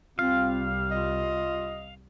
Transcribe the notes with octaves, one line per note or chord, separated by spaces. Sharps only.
C2 G3 C4 F4 F5
F4 D#5